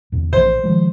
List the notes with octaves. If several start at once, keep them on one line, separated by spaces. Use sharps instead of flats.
E2 A#2
A#1 A#2 E3 C5
D#3 F3 G#3